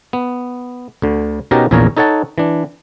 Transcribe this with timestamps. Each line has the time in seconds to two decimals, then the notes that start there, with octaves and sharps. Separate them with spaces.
0.13 B3
1.02 D2 D3
1.51 B2 C#4 D#4 F#4 G4 A#4
1.71 A#1 E2 A#2 C#4 A#4 C#5
1.97 D#4 A4 C#5 F#5 A5
2.38 E3 D4